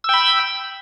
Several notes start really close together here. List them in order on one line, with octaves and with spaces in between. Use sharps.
E6 G5 B5